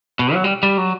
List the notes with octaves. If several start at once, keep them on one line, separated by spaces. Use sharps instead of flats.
B2
F#3
G3
G3
F#3